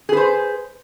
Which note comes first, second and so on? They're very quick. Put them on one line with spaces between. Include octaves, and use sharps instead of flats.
G#4 B4 C5